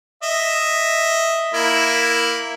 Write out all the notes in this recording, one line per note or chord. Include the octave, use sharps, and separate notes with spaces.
D#5 E5
A#3 E4